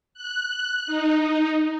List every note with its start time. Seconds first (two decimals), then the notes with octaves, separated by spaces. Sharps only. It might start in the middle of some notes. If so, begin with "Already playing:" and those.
0.14 F#6
0.87 D#4